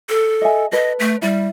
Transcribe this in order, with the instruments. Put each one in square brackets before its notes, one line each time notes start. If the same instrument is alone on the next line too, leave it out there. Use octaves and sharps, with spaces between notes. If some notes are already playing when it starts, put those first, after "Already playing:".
[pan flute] A4
[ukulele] D#5 E5 G#5
[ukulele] A4 B4 [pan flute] D#5
[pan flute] A3
[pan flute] G3 [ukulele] E4